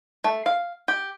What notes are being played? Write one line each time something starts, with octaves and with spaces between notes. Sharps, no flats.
A3
F5
G4